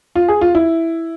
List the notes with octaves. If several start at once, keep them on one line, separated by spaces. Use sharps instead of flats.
F4
G#4
F4
E4